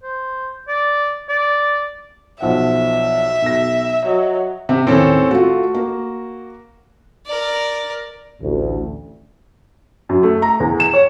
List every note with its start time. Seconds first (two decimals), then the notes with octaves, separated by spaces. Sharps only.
0.03 C5
0.68 D5
1.29 D5
2.40 B1 F3 E5 F#5
3.42 B1 A#6
4.06 F#3 D#5
4.69 C3 E5
4.87 D#2 A2 C4 C#4 A4
5.31 A3 F4 F#4
5.74 A#3
7.26 A#4 D5
8.41 A1 D2
10.09 F#2
10.23 A3
10.42 A#5
10.60 E2
10.80 E7
10.93 C#5